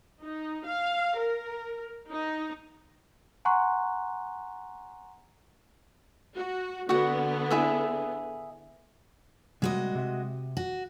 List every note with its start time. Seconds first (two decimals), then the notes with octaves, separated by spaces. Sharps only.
0.22 D#4
0.67 F5
1.19 A#4
2.10 D#4
3.45 F#5 G#5 A#5 C6 C#6 F#6
6.35 F#4
6.89 D3 B3 F#4 F#5
7.50 E4 G#4 E5
9.62 C3 G3 G#3 A#3 F#4 D#5
9.95 C3 E5
10.57 F#4